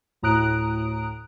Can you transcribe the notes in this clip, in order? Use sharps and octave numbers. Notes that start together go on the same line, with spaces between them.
D2 A2 A#5 D#6 F#6 D7